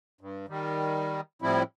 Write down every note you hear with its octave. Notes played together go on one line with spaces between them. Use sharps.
G2
D#3 G3
A2 F3 G3 C4 E4